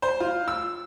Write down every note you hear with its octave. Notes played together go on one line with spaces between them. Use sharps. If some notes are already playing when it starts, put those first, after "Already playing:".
C5
F4
E6